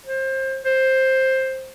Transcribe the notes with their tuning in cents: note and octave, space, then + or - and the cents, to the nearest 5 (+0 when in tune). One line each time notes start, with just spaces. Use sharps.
C5 +25
C5 +10